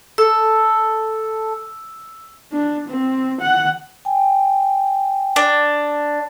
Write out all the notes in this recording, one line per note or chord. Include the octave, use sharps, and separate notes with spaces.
A4 E6
D4
C4
F#5
G5 G#5
D4